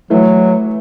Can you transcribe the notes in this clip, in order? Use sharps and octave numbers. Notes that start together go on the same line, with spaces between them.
E3 F#3 A3